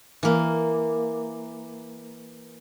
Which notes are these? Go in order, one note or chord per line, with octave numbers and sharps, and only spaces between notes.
E3 A#3